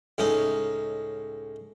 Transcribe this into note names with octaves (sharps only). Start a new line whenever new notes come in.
C#2 A2 C#4 D#4 D#5